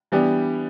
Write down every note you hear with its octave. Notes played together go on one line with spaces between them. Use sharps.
E3 G3 B3 D4 G4